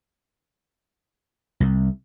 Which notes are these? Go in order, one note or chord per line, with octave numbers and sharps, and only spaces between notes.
C2